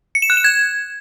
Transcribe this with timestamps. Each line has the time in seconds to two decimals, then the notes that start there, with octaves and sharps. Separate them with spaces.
0.15 C#7
0.22 E7
0.30 F#6
0.37 E7
0.44 G#6